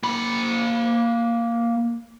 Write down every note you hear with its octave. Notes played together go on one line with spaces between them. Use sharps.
A#3 B5